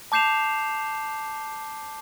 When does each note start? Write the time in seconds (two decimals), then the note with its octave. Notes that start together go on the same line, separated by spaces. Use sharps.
0.12 A5 D6 G6 C7 E7 F7